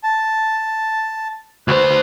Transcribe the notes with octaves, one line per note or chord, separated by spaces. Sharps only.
A5
D2 B4 C5